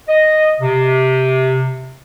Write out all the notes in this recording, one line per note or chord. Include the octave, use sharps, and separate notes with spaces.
D#5
C3